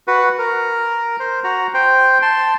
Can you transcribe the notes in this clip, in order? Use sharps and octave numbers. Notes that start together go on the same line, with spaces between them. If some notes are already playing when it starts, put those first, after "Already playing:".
F#4 B4
A#4
C5
F#4 A#5
C5 G5
A5 C6